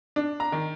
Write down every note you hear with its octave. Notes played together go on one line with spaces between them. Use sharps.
D4
A#5
D#3